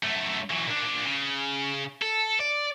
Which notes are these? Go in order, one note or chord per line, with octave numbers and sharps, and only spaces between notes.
F#2 A3
E3 F#3
A#2 D4
C#3
A4
D5